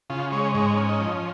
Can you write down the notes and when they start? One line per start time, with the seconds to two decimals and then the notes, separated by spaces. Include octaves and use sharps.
0.10 C#3 F4
0.32 G#3 C#5
0.54 G#2 C#5
0.77 C#4
0.89 D#5
1.00 F3